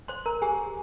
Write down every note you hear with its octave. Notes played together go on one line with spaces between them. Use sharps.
C5 C6
A#4 A#5
G4 G#4 G#5